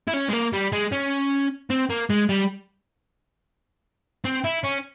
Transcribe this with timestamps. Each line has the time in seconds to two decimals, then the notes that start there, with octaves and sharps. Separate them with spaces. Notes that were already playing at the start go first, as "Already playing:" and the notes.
0.08 E4
0.13 C#4
0.29 G#3
0.33 A#3
0.53 G3
0.72 G#3
0.92 C#4
1.70 C4
1.90 A#3
2.10 G#3
2.29 G3
4.25 C4
4.44 E4
4.64 C#4